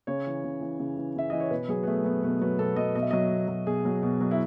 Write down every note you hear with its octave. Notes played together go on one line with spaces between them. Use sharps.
C#3 C#5
E3
C#3
E3
C#3
E3
C#3 E5
E3 D#5
C#5
B2 B4
F#3 G#4
B3
B2 A3
F#3 B3
B2 B3
F#3 B3
B2 A4
F#3 D#5
B2 D#5
E5
F#3 D#5
B2
F#3
B2 G#4
F#3
B2
F#3
E4